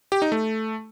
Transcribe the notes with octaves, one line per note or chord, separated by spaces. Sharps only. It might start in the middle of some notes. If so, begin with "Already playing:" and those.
G4
D#4
A3